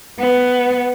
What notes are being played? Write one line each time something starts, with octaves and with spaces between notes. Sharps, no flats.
B3